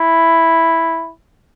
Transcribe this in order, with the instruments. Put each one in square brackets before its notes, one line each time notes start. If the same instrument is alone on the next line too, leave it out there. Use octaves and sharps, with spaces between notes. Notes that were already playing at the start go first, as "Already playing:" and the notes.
Already playing: [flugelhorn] E4